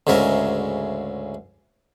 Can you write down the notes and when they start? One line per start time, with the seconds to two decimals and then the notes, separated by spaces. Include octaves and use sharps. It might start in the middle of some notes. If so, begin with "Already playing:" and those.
0.07 D2 G#2 C#3 A#4 E5